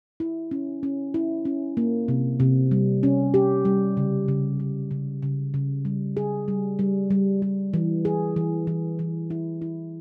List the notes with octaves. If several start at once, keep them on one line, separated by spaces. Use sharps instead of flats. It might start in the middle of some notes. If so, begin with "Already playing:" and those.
E4
C#4
C#4
E4
C#4
A#3
C3
C3
G3
C#4
G4
G3
C#3
C#3
C#3
C#3
C#3
C#3
G3
G#4
G3
G3
G3
G3
E3
G#4
E3
E3
E3
E4
E4